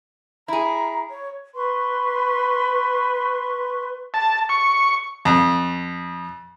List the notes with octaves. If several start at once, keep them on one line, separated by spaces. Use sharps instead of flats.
E4 G#4 A#5
C#5
B4 C6 C#6
A5
C#6
F2